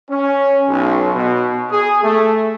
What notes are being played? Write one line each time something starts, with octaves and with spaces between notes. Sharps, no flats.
C#4
B1
B2
G#4
A3